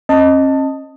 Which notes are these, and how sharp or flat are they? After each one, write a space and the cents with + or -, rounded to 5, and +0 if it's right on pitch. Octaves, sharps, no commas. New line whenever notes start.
C#4 -45 D#5 +0 A5 +20